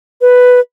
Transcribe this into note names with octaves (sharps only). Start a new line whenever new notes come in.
B4